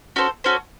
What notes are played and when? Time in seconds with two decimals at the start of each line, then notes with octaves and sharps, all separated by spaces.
0.16 C#4 F#4 A4 C5
0.44 C#4 F#4 A4 C5